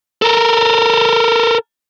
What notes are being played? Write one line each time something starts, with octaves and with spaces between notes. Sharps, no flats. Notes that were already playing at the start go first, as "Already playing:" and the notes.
A4 A#4